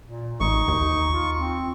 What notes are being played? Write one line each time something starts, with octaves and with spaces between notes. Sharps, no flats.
A#2
A1 D#4 C#6
D#2
F4
C4